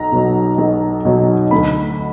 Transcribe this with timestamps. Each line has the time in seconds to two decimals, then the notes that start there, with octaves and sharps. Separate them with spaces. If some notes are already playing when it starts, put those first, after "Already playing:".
Already playing: B1 A#5
0.12 B2 F#3
0.58 B1
1.05 B2 F#3
1.51 D2 B5